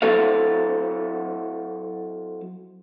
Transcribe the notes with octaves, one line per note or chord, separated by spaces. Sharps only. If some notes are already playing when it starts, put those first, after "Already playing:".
F#3 C4 E4 A4 C#5 F5